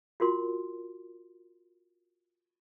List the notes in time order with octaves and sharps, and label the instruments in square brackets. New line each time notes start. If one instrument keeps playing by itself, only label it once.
[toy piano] F4 F#4 A#4 C6